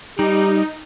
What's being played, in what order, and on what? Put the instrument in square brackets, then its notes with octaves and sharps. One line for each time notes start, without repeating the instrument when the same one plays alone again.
[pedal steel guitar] G3 [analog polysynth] D#4 [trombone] G4